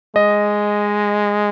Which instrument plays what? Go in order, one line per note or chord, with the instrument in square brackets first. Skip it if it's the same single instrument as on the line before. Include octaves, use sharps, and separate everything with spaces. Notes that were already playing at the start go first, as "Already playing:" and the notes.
[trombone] G#3 [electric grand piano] D#5